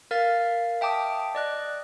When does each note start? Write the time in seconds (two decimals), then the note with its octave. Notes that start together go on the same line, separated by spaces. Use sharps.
0.11 A#4 F5 F6 A6
0.81 E5 G5 A5 D6 D#6
1.35 D5 D#5 F#6